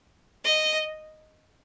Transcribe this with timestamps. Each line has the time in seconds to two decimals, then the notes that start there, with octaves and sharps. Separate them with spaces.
0.44 D#5